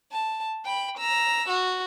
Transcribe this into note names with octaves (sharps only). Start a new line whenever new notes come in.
A5
G5 B5
A#5 E6
F#4